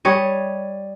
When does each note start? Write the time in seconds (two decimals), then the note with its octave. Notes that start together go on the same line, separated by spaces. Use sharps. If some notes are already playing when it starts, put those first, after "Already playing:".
0.05 G3 C#5 D#5